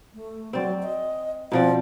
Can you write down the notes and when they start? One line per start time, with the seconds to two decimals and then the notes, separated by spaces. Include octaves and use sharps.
0.15 A3
0.53 F#3 C4 D5
0.83 D#5
1.52 B2 F3 C4 D5